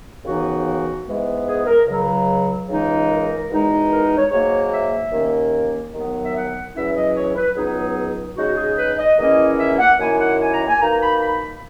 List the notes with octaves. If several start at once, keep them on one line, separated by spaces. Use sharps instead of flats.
D#2 C#3 E3 B3 D#4 F#4
G#2 E3 G#3 B3
G#4
A#4
C#2 C#3 F#3
C#2 C#3 E3 G#3 D#4
A#4
E2 B2 G#3 D#4
A#4
C#5
G#2 F#3 A#3 C#5
E5
D#2 D#3 A#3 C#4
D#2 D#3 F#3 B3
E5
F#5
E2 B2 F#3 C#4 E4 E5
D#5
C#5
B4
C#2 B2 F#3 B3 D#4 G#4
C#3 G#3 D#4 F#4
G#4
B4
D#5
E2 D#3 A#3 C#4 E4 D#5
E5
F#5
F#2 D#3 A#3 E4 G#5
G#5
F#5
G#5
A#5
G#5
B2 A#3 D#4 A#5
B5
B5